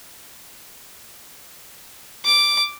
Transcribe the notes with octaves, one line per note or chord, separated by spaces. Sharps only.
D6